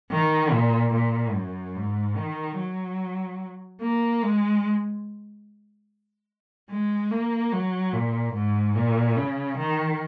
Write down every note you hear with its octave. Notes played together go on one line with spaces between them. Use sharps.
D#3
A#2
A#2
F#2
G#2
D#3
F#3
A#3
G#3
G#3
A#3
F#3
A#2
G#2
A#2
C#3
D#3